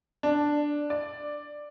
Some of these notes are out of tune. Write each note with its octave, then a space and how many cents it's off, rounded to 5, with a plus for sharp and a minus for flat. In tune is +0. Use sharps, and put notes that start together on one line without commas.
D4 +0
D5 +5